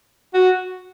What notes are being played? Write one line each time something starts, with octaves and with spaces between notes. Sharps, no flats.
F#4